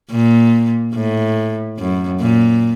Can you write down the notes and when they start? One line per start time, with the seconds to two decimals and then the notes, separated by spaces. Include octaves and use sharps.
0.11 A#2
0.94 A2
1.78 F#2
2.20 A#2